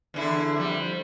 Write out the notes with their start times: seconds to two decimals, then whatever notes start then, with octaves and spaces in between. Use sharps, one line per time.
0.14 E2 D3 E4
0.57 F2 G3